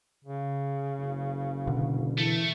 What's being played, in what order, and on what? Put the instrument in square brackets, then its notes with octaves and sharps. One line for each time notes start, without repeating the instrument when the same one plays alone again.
[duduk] C#3
[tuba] F#1
[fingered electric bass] B2 D3
[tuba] E3 [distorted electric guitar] A3